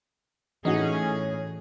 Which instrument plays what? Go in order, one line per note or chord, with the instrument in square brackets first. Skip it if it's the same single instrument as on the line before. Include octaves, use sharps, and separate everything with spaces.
[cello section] A2 G#4 [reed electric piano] E3 [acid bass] C#4 [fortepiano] D#4 F#4